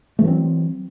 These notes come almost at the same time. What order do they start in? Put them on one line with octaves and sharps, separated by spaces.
A3 E3 F#3 C4